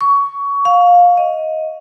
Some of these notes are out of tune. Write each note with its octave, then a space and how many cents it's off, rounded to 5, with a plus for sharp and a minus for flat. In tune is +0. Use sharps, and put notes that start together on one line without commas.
C#6 +20
F5 +20
D#5 +15